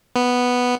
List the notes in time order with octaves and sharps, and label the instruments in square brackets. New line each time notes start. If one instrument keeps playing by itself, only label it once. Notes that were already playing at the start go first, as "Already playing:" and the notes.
[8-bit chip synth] B3